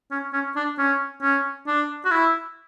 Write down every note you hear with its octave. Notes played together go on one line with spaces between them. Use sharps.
C#4
C#4
D4
C#4
C#4
D4
F#4
E4